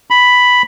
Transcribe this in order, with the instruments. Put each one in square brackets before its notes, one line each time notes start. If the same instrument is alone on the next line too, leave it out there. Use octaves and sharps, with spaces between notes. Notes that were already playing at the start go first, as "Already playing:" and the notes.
[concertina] B5